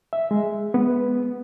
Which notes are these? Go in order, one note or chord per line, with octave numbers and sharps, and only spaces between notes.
E5
G#3
B3